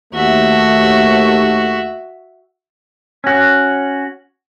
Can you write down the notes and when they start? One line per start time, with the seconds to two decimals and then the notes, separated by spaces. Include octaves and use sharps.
0.14 D#2 A3 F#4 E5
3.24 C#4 F#4